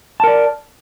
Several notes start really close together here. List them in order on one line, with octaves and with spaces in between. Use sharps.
A5 A#4 D5